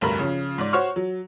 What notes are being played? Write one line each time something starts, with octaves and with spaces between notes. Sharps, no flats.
F1 D2 G2 A#4 B5
C#3 F3
G#2 D5
F#4 C5 C#5 C#6 F6
F#3